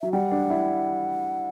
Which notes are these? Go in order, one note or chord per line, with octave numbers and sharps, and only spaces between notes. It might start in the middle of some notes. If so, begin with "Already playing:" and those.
F#3 E5
G3 F#5
D4
E4